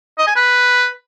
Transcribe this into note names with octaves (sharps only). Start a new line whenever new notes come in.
D#5
G#5
B4